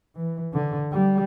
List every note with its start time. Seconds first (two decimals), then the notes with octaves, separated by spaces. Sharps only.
0.16 E3
0.54 D3
0.92 G3